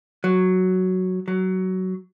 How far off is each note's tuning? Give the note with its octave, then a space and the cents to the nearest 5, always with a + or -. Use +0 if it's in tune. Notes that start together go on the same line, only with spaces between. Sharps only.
F#3 +0
F#3 +15